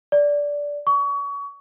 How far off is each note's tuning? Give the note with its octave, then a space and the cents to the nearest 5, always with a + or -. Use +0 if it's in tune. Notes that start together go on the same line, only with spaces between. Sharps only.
D5 -15
C#6 +30